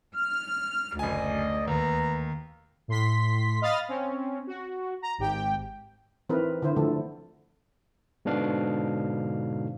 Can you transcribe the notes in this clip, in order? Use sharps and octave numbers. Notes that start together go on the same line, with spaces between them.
F6
F#1 D2 F#3 D5 D#5 G#5
D#2 B4 A#5
A2 C6 B6
D#5 F5 B5 D#6 F6 A6
C4 C#4
F#4
A#5
G#1 G#2 G4 G5
E3 C4 D#4 E4 A#4 B4
D3 E4 C5
D3 F3 A3 A4
G#2 B2 D3 D4 F5